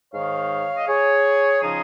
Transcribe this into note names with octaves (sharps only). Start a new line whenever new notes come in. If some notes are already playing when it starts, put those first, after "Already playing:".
G#2 D#3 C#5 F5
D#5
G#4 C#5
C#3 F3 D#4 G#4